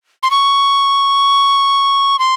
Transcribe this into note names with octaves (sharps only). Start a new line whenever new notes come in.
C6
C#6
C6